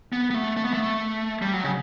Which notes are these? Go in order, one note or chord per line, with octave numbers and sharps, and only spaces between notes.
B3
B3
A3
A3
B3
A3
G3
F#3
C#3